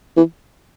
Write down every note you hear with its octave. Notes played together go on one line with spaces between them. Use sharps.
E3